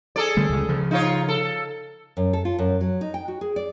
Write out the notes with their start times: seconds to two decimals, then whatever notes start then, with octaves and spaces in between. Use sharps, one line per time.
0.16 G#4 A4 D5
0.37 D3 G3 A3
0.49 C#2 C#3
0.69 C#3 F3
0.91 D#4 F4 C#5
1.28 A4
2.17 F#2
2.33 A4
2.45 F4
2.59 F#2
2.81 F#3
3.01 D#4
3.14 G5
3.28 F#4
3.41 G#4
3.56 D5